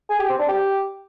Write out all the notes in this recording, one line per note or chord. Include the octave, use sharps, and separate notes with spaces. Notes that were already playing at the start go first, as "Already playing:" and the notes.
G#4
G4
C4
D4
G4